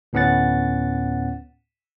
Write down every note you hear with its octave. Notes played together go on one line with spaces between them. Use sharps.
D2 A2 B3 C#4 F#5 A6